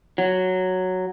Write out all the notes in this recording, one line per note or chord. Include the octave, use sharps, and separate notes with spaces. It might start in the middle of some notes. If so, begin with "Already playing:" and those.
F#3